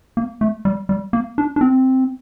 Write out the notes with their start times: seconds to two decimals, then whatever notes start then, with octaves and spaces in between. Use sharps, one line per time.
0.17 A#3
0.41 A3
0.65 G3
0.89 G3
1.13 A#3
1.38 D4
1.56 D4
1.61 C4